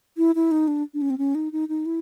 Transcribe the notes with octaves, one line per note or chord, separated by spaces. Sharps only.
E4
E4
D#4
D4
D4
C#4
C4
C#4
D#4
D#4
D#4
E4